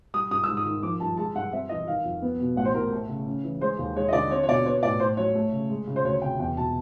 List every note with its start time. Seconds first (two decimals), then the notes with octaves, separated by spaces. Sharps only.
0.14 G3 D#6
0.31 G2 D#6
0.44 G#2 E6
0.57 D#6
0.65 D#3
0.83 F3 D6
1.00 G2 A5
1.17 G#3 A5
1.35 G2 F#5
1.52 C4 E5
1.69 E3 D#5
1.87 D#3 F5
2.04 F2
2.22 B3
2.40 B2
2.56 A1 F#5
2.65 C5
2.74 A2 A#4
2.92 A3
3.09 C#3
3.26 C#4
3.43 E3
3.61 G#3 C5
3.78 D#2
3.96 G#3 C#5
4.08 D#5
4.13 D3 D5
4.31 C4 C#5
4.43 C#5
4.48 B2 D5
4.65 B3 C#5
4.83 A2 D5
5.00 A2 C5
5.17 F#3 C#5
5.35 A3
5.52 C#3
5.69 G#3
5.87 C#3
5.96 C5
6.04 D2 C#5
6.22 C3 G5
6.39 E2 G5
6.56 B2 A5